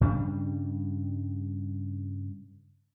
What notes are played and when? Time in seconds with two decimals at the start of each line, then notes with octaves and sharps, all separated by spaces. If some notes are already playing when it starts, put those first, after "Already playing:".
0.01 G2 C#3 G3 D4